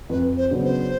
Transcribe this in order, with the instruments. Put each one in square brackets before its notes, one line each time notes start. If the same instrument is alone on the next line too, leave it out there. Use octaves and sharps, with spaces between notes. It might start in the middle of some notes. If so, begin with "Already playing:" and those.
[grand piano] F2 [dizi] B4
[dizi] C5
[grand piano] C#3 F#3 B3 D4
[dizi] C5